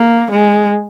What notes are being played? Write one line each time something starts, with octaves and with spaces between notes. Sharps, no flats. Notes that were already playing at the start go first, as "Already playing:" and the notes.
Already playing: A#3
G#3